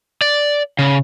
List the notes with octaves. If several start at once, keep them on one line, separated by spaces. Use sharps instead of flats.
D5
C#3